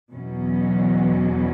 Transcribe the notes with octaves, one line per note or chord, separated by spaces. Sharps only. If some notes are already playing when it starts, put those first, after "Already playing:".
E2 B2 F#3 C#4